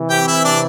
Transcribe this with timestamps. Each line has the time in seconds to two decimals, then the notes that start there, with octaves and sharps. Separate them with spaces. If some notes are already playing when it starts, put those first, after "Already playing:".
Already playing: C3 E3
0.10 G4 G5
0.27 E4 E5
0.44 D4 D5